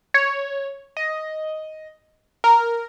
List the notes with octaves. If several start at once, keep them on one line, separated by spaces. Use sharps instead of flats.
C#5
D#5
A#4